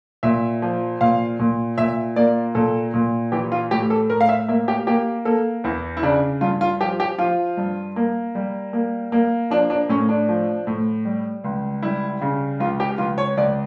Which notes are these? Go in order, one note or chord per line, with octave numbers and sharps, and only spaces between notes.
A#2 E5
F3
A#2 F5
A#2
A#2 E5
A#3 D5
A#2 A4
A#2
E3 G4
F4
A2 G4
A4
A2 A#4
F5
E5
A#3 E5
G4
A#3 G4
A#3 A4
E2 E4
E4
C#3 D4
G2 F4
F4
F3 G4
G4
F3 F4
G2
A#3
G3
A#3
A#3
F3 D4
D4
A2 C#4
D4
F3
A2
G3
C#2
G3 E4
C#3
C#2 F4
G4
C#2 F4
C#5
C#2 D5